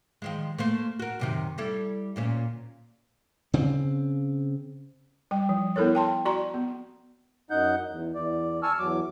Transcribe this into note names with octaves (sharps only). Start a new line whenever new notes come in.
D#3 F3 G#3
A3 A#3 C5
F#4 A#4
F#2 C3 D#3
G3 E4 A4
D2 A#2 C#4
C#3 C4
G3 G5
F3
B3 E4 A4 A#4 C#5
G5 A5 C6
F#4 D5 A#5 C6
B3
F#2 D#4 F#5 G6
E2
E2 D5
G#5 A5 C#6 E6 F6
E2 F#3 D6